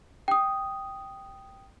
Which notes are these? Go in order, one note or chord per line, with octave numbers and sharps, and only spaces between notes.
G5 D#6